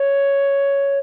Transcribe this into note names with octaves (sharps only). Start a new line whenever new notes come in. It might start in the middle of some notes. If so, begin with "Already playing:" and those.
Already playing: C#5